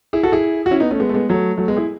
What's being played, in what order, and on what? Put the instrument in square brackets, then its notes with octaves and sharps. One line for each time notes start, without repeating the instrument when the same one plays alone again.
[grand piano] E4 G#4
F#4 A4
E4 G#4
F#4
C#4 E4
B3 D#4
A3 C#4
G#3 B3
A3
G#3 B3
F#3 A3
F#3 A3
G#3 B3
E4 G#4